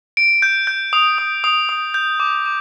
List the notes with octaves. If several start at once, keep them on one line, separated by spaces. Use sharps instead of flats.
D7
G6
G6
D#6
D#6
D#6
D#6
G6
D6
D6